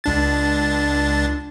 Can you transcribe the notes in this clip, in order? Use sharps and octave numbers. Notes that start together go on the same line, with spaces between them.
C#2 D4 A6